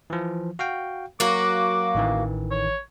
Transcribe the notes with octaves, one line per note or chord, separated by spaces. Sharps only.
E3 F3
F#4 F5 G5
F#3 A#3 F#4 D6
A1 D#3 E3
C#5